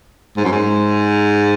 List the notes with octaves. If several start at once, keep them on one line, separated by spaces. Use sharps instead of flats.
G#2
F#2
G#2